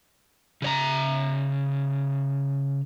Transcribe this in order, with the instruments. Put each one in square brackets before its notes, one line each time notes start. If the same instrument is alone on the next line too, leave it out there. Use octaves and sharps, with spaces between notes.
[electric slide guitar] C#3 C#5 A#5